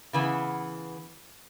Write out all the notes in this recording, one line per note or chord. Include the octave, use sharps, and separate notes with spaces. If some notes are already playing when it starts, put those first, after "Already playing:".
C#3 E3 B3